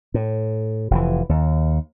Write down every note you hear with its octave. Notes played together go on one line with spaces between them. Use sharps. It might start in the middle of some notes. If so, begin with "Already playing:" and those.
A2
F1 C3 E3
D#2